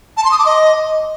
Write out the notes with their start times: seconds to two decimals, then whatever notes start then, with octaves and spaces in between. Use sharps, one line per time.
0.17 A5
0.24 C6
0.32 D#6
0.39 D6
0.46 D#5